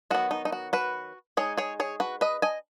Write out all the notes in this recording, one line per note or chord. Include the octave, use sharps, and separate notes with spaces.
D#3 F#3 B3 F#4
D#4
D#4
F#4
F#4 B4
G#3 D#4 G#4 C#5
G#4 C#5
G#4 C#5
F#4 B4
B4 D#5
D#5 G#5